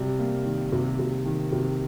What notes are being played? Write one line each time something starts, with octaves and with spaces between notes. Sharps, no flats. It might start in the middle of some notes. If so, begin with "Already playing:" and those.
Already playing: C3 G3
A#3
D#3
C3
C3
D#3
C3